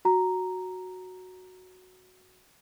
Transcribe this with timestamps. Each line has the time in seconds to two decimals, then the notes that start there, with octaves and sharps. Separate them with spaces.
0.05 F#4 A#5